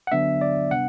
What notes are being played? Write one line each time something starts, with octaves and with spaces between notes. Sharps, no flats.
F#5
D3 F#3 B3 D4 E5
D5
C3 G3 B3 D4 F#5